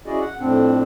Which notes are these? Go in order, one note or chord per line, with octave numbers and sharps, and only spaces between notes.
C#4 E4 F#4 G#4 D5 D#5
F#5
F2 A2 C4 D4